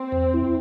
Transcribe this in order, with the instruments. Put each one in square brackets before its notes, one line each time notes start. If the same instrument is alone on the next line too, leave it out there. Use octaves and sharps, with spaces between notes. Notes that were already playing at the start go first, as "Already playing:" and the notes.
Already playing: [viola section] C4
[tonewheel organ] E2
E4